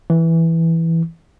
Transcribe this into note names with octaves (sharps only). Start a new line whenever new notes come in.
E3